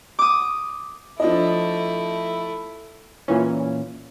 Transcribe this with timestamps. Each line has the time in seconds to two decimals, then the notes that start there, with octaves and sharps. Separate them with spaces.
0.19 D6 D#6
1.20 F3 A3 D4 E4 D#5
3.28 A#2 E3 C#4